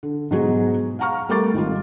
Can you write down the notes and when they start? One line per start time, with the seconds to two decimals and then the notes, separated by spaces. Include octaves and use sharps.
0.03 D3
0.31 G#2 B2 F#3 D#4 F#4 G#4
0.99 F5 F#5 A#5 C#6 F6
1.29 G3 A3 A#4 C#6 D6 A6
1.53 G#1 D#3 G3 F4